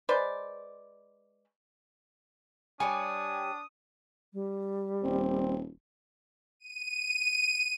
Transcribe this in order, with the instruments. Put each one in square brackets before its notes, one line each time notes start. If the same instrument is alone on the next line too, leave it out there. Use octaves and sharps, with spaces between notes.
[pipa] G#3 B4 C5 D5
[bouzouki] G3 C#5 D5 [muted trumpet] D4 [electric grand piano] G#5 [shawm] D#6
[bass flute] G3
[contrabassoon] D#1 [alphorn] C4
[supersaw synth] D#7